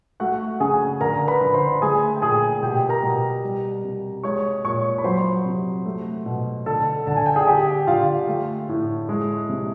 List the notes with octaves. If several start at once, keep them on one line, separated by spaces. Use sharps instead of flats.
A3 F#4 F#5
C#3 G#4 G#5
D3 A#4 A#5
B4 B5
D3
C5 C6
A3 G#4 G#5
G5
A#2 G#4 G#5
B2 G4 G5
A#4 A#5
B2
G3
C3
G#3 C#5 C#6
A#2 C#5 C#6
B5
F#3 C5 C6
C3
A3
B2
D3 A4 A5
D3 A5
G#5
G5
G#4 G#5
D3 G4 G5
D3 F4 F5
A3
A2
G#3
C3